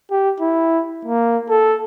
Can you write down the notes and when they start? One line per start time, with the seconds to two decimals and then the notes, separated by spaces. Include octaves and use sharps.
0.11 G4
0.40 E4
1.05 A#3
1.49 A4